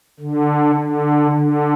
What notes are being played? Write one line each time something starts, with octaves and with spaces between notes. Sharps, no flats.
D3
D3
D3